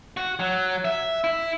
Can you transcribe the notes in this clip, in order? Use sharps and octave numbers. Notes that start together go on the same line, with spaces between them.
F#4
F#3
E5
E4